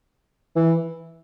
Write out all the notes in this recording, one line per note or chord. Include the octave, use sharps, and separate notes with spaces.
E3